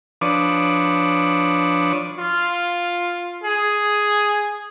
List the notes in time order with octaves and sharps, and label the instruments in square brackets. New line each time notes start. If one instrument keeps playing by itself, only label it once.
[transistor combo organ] F3 D4 B4 C#5 D6 D#6
[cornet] F4
G#4